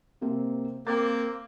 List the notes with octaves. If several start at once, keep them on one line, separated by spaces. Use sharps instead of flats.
C3 A#3 C4
A#3 C4 D6 A6